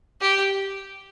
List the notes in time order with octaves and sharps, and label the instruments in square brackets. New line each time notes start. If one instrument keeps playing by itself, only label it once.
[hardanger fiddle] G4